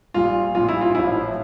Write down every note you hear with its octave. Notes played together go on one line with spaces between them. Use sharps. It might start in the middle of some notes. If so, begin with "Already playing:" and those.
A#1 A#2 G3 F4
A#1 A#2 G3 F4
E4
F4
A1 A2 F3 E4